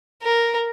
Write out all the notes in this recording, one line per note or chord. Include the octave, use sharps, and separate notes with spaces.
A#4